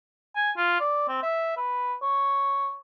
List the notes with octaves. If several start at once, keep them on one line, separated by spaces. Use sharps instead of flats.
G#5
F4
D5
C4
E5
B4
C#5